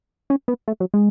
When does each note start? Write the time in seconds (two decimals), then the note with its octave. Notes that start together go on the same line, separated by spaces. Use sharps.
0.30 C#4
0.48 B3
0.68 A3
0.80 F#3
0.94 G#3